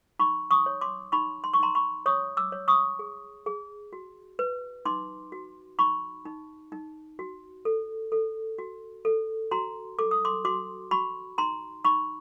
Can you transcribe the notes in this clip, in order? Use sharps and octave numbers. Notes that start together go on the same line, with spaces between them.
D#4 B5 C#6
C#6 D#6
C#5
C6 D6
D#4 B5 C#6
C6
C#6
D#4 A#5 C6
B5 C#6
C#5 C#6 D#6
D6 E6
C#5
C#6 D#6
G#4
G#4
F#4
B4
D#4 C6 D6
F#4
D#4 B5 C#6
D#4
D#4
F#4
A4
A4
F#4
A4
F#4 A#5 C6
A4 D6
D#6
C6 D6
F#4 C6 D6
F#4 B5 C#6
D#4 A#5 C6
D#4 B5 C#6